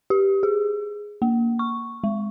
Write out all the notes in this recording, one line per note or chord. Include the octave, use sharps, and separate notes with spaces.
G4
G#4
A#3
C#6
G#3